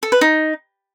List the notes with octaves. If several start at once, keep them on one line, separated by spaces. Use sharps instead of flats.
A4
B4
D#4